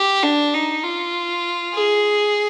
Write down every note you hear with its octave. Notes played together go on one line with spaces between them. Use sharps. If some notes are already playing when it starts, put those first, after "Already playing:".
Already playing: G4
D4
D#4
F4
G#4